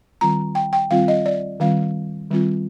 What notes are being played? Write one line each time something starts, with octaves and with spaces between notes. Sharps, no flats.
D#3 G3 C4 F4 A#5
G5
G5
D#3 G3 C4 F4 F5
D#5
D5
D#3 G3 C4 F4 F5
D#3 G3 C4 F4